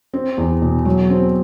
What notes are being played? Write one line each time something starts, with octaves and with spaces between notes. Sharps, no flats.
C4
E2
B2
F#3
C4